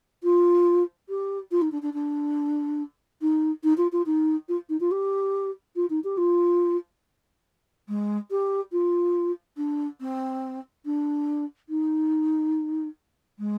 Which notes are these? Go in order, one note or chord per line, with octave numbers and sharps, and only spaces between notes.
F4
G4
F4
D#4
D4
D4
D4
D#4
D#4
F4
F4
D#4
F4
D#4
F4
G4
F4
D#4
G4
F4
G#3
G4
F4
D4
C4
D4
D#4
G#3